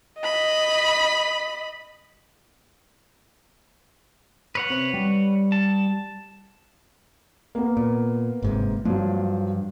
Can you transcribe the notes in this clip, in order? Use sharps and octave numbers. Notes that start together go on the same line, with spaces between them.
D#5 B5
B4 C#5 F#5
C3
G3
A5
A#3 B3
A#2
G1 G#2 C3
G2 F3 F#3